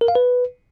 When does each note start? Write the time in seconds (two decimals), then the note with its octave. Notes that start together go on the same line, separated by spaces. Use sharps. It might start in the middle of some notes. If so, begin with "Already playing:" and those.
0.01 A#4
0.08 F5
0.15 B4